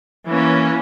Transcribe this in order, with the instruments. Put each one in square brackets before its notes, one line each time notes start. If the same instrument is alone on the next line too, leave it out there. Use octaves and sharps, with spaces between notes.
[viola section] E3 A#3 C#4